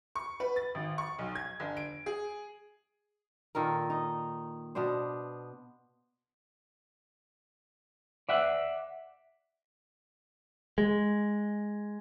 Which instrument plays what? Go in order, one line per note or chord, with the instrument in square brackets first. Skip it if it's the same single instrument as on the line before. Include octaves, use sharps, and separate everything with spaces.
[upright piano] C#6
B4
A6
G#1
C#6
B1
G#6
G1
D7
G#4
[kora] A#2 D#3 A4 A#4
D#4
B2 B3 D4 C5
[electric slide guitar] D5 E5 F#5
[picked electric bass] G#3